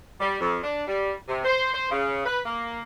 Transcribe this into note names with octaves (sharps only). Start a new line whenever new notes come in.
G3
F2
D4
G3
C3
C5
C5
C#3
B4
A#3